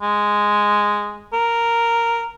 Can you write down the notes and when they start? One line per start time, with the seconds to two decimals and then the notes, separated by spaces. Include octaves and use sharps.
0.02 G#3
1.33 A#4